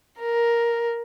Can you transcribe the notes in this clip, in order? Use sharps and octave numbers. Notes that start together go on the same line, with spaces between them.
A#4